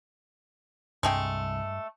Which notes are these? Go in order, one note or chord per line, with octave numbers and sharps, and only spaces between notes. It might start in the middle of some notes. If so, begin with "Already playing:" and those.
C2 G2 G#3 A3 G5